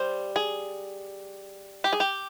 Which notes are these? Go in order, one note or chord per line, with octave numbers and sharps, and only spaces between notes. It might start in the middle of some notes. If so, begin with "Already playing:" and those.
Already playing: G3 C5
G#4
G4
G#4
G4